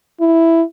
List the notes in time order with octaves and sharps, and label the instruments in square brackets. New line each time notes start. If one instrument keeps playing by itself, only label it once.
[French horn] E4